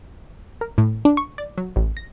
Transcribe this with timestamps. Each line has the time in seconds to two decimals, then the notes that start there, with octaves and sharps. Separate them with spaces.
0.61 A#4
0.78 A2
1.05 D4
1.17 C#6
1.38 D5
1.58 F#3
1.76 A1
1.97 A#6